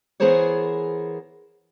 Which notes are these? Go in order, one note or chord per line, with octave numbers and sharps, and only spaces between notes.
E3 B3 G#4 A#4 C5 C#5